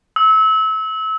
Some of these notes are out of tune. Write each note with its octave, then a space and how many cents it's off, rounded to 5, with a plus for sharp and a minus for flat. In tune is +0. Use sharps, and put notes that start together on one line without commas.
E6 -30